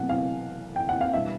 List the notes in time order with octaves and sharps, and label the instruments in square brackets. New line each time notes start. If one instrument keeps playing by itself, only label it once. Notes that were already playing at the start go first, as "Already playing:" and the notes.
Already playing: [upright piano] B2 F#3 A3 C4 F#5
F5
G5
F#5
F5
B2 G3 B3 D4 E5